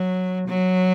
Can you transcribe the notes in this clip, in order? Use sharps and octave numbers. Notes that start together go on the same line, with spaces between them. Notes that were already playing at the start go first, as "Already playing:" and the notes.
Already playing: F#3
F#3